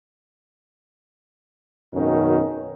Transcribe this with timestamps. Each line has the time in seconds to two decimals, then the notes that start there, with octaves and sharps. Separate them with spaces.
1.94 G#1 F#2 B2 D#3 C#4 D#4